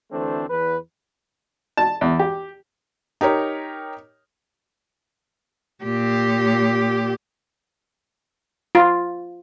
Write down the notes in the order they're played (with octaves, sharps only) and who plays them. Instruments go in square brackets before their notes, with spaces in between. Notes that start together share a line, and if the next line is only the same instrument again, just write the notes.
[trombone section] D2 E3 A3 C4 D4 C5
E2 B4
[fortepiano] A5
E2
G4
[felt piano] D#4 G4 A#4 C#5
[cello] A#2 G4
[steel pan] F4